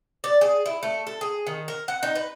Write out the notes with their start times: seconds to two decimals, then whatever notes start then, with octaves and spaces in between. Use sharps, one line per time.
0.24 D5
0.41 G#4
0.66 E4
0.83 A3
1.07 A4
1.21 G#4
1.47 D#3
1.68 A#4
1.88 F#5
2.03 D#4
2.15 B4